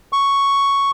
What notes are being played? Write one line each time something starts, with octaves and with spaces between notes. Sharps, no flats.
C#6